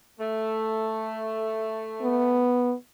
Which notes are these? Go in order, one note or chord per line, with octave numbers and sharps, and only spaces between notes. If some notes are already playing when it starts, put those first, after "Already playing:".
A3
B3